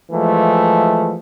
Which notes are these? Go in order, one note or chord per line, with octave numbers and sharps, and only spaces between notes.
E3 F3 G#3 A3